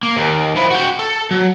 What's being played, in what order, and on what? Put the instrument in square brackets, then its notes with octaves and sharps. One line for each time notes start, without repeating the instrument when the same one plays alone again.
[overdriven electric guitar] A#3
D#2 D#3
F3 E4
F#4 G5
A4
F#3